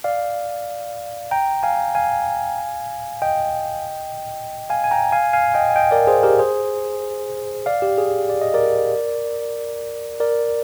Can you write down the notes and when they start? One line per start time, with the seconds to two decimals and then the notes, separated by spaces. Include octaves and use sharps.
0.04 D5 F5
1.31 G5 A#5
1.63 F5 G#5
1.95 F5 G#5
3.22 D#5 G5
4.70 F5 G#5
4.84 G#5
4.91 G5 A#5
5.12 F5 G#5
5.33 F5 G#5
5.54 D#5 G5
5.70 G#5
5.76 D#5 G5
5.91 A#4 D5
6.07 G#4 C5
6.23 G4 A#4
6.39 G#4 C5
7.66 D5 F5
7.82 G4
7.98 G#4
8.30 D5
8.41 D#5
8.54 A#4 D5
10.20 A#4 D5